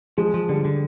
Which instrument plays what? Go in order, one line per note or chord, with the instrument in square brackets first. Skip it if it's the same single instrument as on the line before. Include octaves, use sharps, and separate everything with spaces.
[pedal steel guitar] F3 [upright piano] G#3
[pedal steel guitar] F3
[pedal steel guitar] D3 [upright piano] G3
[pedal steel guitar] D3